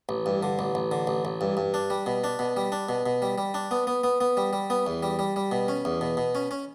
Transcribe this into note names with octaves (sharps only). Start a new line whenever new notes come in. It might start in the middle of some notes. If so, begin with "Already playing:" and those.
A1
G2
D3
A1
A1
D3
A1
A1
G2
G2
D4
G3
B2
D4
B2
G3
D4
B2
B2
G3
G3
D4
B3
B3
B3
B3
G3
G3
B3
E2
G3
G3
G3
B2
C#4
E2
B2
B2
C#4
C#4